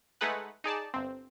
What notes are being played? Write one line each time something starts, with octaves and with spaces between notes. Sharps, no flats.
G#3 A3 D#4 G#4 B4 F#5
D#4 G#4 D5 A5
G1 C4